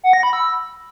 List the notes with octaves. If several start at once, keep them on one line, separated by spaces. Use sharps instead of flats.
F#5
A#6
B5
E6